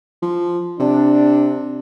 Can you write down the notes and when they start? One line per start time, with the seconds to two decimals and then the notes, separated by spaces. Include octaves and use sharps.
0.22 F3
0.80 C3 D4